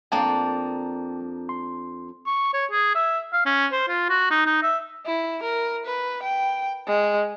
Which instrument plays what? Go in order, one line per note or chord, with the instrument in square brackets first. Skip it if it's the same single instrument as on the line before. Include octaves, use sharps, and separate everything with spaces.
[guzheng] F2 A#3 D4 [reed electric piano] G5 A5
[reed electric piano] C6
[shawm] C#6
C#5
G#4
E5
F5
C#4
C5
F4
F#4
D#4
D#4
E5
[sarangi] E4
A#4
B4
G5
G#3